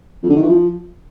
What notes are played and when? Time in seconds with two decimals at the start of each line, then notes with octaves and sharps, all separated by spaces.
0.23 F2
0.29 D3
0.36 D#3
0.42 E3
0.49 F3